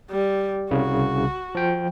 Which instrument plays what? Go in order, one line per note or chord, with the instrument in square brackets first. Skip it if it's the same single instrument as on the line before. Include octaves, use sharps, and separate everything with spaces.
[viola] G3
[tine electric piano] C2 C#3 [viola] F#4
[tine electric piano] F3 G5